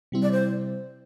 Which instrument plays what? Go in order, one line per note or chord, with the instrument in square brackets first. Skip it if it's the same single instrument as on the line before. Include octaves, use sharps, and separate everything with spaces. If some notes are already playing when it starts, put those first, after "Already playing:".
[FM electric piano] C3 G3 C4 E4
[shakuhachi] D5
C5